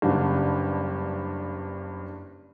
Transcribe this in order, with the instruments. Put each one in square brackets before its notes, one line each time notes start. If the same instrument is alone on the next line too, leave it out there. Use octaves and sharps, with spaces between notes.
[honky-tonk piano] F#1 G2